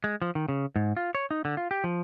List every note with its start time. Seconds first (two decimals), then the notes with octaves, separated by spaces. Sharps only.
0.04 G#3
0.22 F3
0.35 D#3
0.48 C#3
0.76 G#2
0.97 F4
1.15 C#5
1.31 D#4
1.45 D3
1.57 F4
1.71 G4
1.84 F3